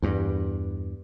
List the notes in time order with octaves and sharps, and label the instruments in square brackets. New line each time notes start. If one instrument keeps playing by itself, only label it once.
[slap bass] E2 G2